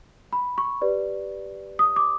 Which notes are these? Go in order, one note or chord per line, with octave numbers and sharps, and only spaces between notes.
B5
C#6
G4 B4 D5
D#6
D6